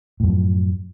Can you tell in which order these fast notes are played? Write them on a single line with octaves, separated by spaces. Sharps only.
A2 F#2 F3